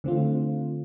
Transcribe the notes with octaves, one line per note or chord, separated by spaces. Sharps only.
D3 A3 C4 F4